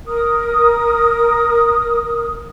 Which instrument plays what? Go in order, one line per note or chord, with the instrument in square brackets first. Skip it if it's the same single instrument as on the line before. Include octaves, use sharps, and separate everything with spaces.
[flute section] A#4 D#6